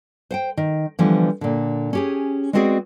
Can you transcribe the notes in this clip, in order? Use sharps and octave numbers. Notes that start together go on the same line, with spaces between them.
C5 F#5 G5
D#3
D3 E3 F3 G3 B3
A#2 D3
C#4 G4 G#4
G#3 B3 C4 F#4 G#4 D5